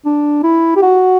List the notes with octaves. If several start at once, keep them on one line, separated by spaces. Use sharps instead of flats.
D4
E4
G4
F#4